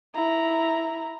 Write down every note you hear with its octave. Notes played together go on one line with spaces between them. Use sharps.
E4 A#5